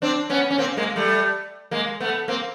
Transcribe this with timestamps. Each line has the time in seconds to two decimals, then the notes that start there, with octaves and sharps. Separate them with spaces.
0.02 C4 D4
0.30 B3 C#4
0.51 C#4
0.58 A#3 C4
0.77 G#3 A#3
0.96 G3 A3
1.71 G#3 A#3
2.00 A3 B3
2.28 A#3 C4